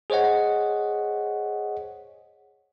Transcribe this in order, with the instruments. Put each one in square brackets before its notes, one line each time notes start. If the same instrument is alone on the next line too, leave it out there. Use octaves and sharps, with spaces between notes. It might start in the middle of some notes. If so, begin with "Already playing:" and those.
[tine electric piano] G#4 C5 C#5 D#5 F#5